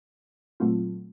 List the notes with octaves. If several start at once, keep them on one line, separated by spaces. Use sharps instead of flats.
A#2 F#3 A3 C4 F4